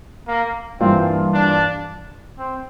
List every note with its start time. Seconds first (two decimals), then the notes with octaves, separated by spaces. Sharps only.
0.27 A#3
0.80 G2 E3 A#3 C4 F4
1.33 D4
2.38 C4